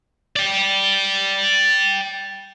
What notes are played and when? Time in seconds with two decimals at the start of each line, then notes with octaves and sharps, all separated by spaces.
0.36 D5 G5